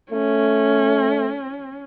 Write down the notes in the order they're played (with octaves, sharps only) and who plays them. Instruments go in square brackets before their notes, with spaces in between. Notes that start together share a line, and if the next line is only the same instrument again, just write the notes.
[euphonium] A3 [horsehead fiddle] C#4